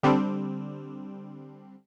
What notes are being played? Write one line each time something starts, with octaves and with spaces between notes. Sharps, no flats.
D3 G3 C4 D4